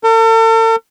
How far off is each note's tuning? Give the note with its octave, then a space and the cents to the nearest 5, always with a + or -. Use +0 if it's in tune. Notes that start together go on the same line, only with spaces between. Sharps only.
A4 +45